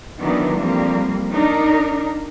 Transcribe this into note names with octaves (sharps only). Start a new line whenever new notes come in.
D#3 E3 F#3 B3 D4
F2 G3 A#3
D4 D#4 A#4